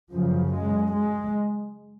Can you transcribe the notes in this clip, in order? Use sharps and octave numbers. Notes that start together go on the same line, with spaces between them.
F#2 C#3 F3
G#3
G#3